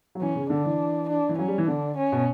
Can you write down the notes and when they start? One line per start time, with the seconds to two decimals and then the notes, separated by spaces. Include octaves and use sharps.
0.15 F#3
0.21 E3 C#4
0.35 C#3
0.50 D3 D4
0.65 E3
1.09 D4
1.29 E3
1.38 F#3 C#4
1.48 G3
1.58 E3
1.68 D3 D4
1.97 C#4
2.12 B2